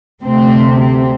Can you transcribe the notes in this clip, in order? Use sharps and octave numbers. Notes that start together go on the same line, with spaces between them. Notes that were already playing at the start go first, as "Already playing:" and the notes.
D2 C3 A3 C4
C4